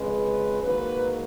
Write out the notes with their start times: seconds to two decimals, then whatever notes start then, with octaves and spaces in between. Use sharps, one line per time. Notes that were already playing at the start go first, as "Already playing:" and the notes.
Already playing: F2 C#3 G#3 B4
0.61 G#2 D#3 F#3 A#3 B4